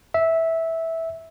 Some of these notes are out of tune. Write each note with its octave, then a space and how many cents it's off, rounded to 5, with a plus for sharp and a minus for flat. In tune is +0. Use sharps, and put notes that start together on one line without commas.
E5 -10